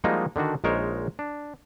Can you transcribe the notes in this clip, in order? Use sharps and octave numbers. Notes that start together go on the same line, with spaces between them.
F3 G3 G#3 A#3 D#4 F#4
D3 D#3 D4 F#4
A#1 G#3 D#4 A#4 C5 C#5
D4